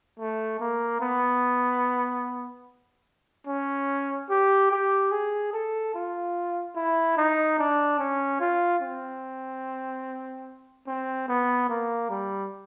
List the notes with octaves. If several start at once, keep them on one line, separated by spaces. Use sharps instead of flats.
A3
A#3
B3
C#4
G4
G4
G#4
A4
F4
E4
D#4
D4
C#4
F4
C4
C4
B3
A#3
G3